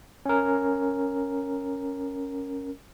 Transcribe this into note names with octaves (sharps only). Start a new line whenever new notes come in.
C#4 A#4